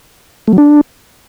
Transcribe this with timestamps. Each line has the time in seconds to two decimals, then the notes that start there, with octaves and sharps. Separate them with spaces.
0.48 A3
0.53 F#3
0.58 D4